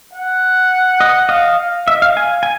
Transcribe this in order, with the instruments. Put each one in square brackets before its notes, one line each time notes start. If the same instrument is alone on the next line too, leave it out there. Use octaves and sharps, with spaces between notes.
[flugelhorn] F#5
[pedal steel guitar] D#5
[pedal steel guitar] D#5 [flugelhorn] F5
[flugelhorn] F5
[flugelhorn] D#5 [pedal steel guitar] E5
[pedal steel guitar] F5
[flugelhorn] F5 [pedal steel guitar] G#5
[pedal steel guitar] G#5